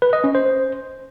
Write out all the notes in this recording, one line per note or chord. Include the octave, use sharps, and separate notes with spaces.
B4
D#5
C#4
C5